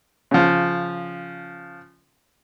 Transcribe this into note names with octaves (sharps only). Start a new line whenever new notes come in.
C#3 F3